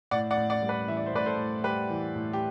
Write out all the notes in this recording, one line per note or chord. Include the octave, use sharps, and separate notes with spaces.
A2 D5 F#5
D5 F#5
A2
D5 F#5
G3
B4 D5
E3 E5
D5
C5
A2 B4 D5
A4 C5
A2
G3 G4 B4
E3
A2
G4